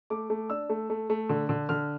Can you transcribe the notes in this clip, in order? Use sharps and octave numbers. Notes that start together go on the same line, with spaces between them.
A3 D6
A3
D4 E6
A3
A3
A3
D3
D3
D3 F6